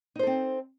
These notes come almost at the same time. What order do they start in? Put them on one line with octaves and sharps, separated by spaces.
D#4 C5 A4 C4